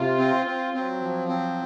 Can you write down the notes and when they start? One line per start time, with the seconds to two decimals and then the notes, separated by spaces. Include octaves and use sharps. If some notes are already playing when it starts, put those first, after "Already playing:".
Already playing: C3 F4
0.18 C4
0.46 C4
0.73 F#3 C4
1.01 F3
1.28 C4